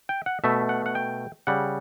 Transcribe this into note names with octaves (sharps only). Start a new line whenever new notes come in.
G5
F#5
B2 A3 E5
F#5
F#5
G5
C#3 G3 F#5